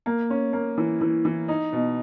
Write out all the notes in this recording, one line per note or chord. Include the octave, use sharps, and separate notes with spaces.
A#3
C#4
A#3
E3
E3
E3
D#4
B2